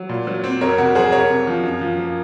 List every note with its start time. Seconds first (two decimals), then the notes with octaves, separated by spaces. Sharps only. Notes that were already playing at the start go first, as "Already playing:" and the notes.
Already playing: F#3
0.09 A#2
0.27 F#3
0.44 C4
0.61 F2 A#4 C#5
0.78 C3 F#4 A#4
0.95 F#3 G#4 C5
1.12 C2 A#4 C#5
1.30 C3
1.47 F3
1.64 F#2
1.81 F3
1.98 A#3